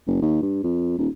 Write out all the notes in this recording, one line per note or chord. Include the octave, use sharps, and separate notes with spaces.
F#1
D#2
G2
F2
D#1